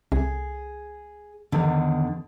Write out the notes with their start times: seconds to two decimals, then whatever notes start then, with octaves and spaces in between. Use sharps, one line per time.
0.12 C2 G#4
1.52 E2 D3 D#3